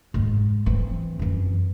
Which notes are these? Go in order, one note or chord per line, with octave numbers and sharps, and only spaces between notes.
G#2 G#3
E3 C4
F#2 E3